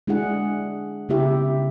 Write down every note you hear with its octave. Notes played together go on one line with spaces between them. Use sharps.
G#3 D4 E4 G#4 F#5
C#3 B3 E4 G4 E5